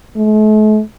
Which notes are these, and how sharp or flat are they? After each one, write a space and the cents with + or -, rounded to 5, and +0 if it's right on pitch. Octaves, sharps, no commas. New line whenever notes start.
A3 -45